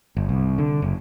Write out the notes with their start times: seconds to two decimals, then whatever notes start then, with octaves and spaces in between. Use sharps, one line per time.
0.17 G1
0.29 C2
0.58 D3
0.82 F#1